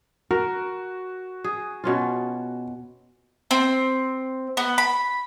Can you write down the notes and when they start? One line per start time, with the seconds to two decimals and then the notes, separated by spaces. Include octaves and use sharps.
0.31 F#4 A#4
1.44 G#4
1.84 B2 C#4 F4
3.51 C4
4.57 B3
4.78 B5